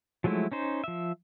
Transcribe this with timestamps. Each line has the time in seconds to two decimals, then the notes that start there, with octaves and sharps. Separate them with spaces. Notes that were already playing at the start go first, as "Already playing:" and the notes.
0.24 F3 F#3 G#3 A3 E4
0.52 C#4 D#4 C5
0.84 F3 E5